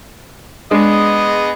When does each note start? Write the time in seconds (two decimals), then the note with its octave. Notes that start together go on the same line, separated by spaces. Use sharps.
0.71 G#3 B3 D4 G#4 D#5